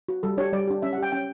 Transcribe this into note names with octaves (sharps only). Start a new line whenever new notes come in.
F#4
G3 A4
D4 G4 C#5
G3 D5
D4 G4
C#4 E5
F#5
G4 G5
C#4 G5